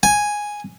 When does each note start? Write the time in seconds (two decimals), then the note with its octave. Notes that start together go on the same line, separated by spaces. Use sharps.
0.03 G#5